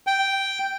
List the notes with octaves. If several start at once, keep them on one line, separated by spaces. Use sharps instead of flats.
G5